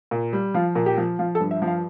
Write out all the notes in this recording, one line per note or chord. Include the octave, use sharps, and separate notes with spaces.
A#2
G3
F3 F4
A#2
G4
F3
F3 F4
A4
G2
E5
F3
F5